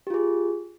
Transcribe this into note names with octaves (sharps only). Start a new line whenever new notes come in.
F4 G4 G#4